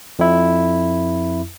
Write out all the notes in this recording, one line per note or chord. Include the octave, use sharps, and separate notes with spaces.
F2 E4